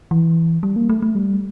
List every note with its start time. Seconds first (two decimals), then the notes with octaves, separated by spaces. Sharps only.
0.11 E3
0.63 G3
0.76 A#3
0.89 A3
1.02 A3
1.15 G3